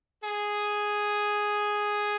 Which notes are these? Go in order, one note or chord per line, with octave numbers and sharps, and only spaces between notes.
G#4